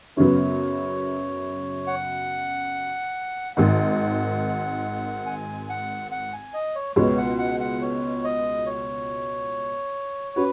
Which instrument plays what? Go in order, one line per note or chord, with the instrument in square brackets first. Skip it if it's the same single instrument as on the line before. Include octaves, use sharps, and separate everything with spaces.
[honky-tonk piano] F#2 C#3 F#3 B3 [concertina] C#5
[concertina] F#5
[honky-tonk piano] G#1 G#2 D#3 [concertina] F#5
[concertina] G#5
F#5
F#5
G#5
D#5
C#5
[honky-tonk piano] C#2 B2 G#3 B3 F#4 [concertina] C#5
[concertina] F#5
F#5
F#5
C#5
D#5
C#5
[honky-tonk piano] C#4 F#4 [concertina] B4